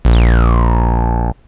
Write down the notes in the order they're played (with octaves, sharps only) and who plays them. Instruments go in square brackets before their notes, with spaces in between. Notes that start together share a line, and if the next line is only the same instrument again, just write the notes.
[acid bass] A#1